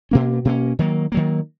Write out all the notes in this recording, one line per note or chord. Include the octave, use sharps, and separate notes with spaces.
B2 A#3 C#4
B2 A#3 C#4
D#3 F#3 A#3
D#3 F#3 A#3